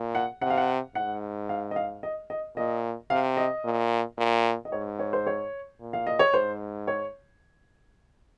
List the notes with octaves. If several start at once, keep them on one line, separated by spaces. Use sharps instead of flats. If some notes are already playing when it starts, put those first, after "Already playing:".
Already playing: A#2
F#5
C3 F#5
F5
F#5
G#2 F#5
F5
D#5
F5
D#5
D#5
A#2 D#5
C3 F5
D#5
A#2
A#2
D#5
G#2 C#5
C#5
C5
C#5
A#2
F5
D#5
C#5
G#2 C5
C#5